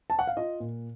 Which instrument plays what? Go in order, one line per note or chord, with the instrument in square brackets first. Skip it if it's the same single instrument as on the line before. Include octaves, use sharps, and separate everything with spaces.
[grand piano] A5
F#5
F5
F4 D#5
A#2